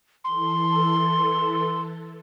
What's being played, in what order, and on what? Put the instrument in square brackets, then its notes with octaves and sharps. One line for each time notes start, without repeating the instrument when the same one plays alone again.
[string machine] E3 A4 [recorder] C6